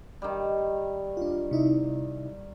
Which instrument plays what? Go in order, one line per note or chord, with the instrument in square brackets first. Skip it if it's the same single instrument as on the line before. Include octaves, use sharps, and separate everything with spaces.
[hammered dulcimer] D#3 G3
[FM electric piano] D4 F4
C3 D#4 E4